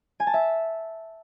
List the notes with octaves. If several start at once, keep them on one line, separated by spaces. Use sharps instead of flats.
G#5
A5
E5